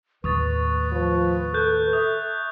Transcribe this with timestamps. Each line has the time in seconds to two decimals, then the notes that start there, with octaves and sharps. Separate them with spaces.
0.24 D#2 A2 B4 C#6 D#6 A6
0.92 F3
1.54 A4 F#6 G6
1.93 E5 D#6